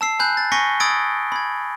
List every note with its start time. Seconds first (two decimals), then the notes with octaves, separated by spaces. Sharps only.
0.01 A5 E6 C7
0.19 G#5 B5 F#6 G6
0.37 A6
0.52 G#5 C#6 A#6 B6 C#7 G7
0.80 B5 D#6 E6 G#6 A6 D7
1.32 B5 G#6